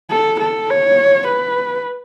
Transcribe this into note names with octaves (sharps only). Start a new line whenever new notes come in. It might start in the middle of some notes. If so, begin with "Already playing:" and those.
A4
A4
C#5
B4